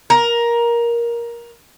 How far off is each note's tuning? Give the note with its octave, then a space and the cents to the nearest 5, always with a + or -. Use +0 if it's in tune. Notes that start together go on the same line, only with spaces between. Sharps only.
A#4 +15